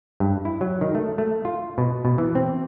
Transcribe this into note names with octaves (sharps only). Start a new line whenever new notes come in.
G2
E4
F#3
D#3
A3
A3
F4
B2
B2
E3
C4